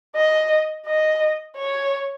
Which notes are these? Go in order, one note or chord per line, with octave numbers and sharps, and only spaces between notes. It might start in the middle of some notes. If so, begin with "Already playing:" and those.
D#5
D#5
C#5